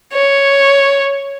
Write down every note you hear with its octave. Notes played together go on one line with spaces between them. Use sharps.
C#5